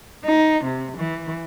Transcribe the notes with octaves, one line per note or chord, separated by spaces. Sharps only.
D#4
C3
E3